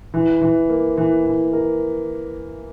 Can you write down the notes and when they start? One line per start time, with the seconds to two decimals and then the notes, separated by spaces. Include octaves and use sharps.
0.14 E3
0.41 E3
0.69 A#3
0.97 E3
1.26 E3
1.53 A#4